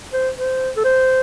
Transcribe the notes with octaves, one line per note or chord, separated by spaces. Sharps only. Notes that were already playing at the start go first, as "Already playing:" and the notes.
C5
C5
A4
C5